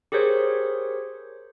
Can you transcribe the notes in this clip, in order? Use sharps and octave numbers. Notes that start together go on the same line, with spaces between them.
G4 G#4 A#4 C5 C#5